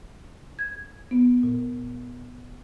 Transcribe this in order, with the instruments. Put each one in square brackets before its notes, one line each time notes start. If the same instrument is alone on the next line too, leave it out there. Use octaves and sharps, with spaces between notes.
[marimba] G#6
B3
A#2